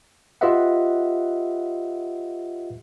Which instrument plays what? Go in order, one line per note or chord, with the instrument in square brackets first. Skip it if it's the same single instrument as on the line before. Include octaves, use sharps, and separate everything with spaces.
[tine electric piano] F4 G4 B4 D#5 E5 F#5